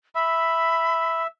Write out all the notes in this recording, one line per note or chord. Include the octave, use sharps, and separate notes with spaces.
E5 B5